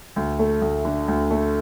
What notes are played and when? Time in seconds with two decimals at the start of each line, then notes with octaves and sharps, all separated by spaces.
0.16 D2
0.39 A3
0.62 D2
0.85 D3
1.08 D2
1.31 A3